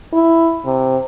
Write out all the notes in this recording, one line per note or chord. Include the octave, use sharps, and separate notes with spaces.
E4
C3